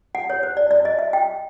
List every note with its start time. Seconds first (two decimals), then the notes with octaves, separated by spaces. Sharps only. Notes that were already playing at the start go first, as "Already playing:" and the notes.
0.15 F#5
0.30 C#5
0.43 C5
0.57 D5
0.71 D5
0.85 D#5
0.99 E5
1.13 G5